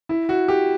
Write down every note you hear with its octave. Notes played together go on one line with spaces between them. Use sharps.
E4
F#4
G4